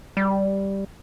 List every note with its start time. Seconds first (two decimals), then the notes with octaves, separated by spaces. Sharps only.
0.17 G3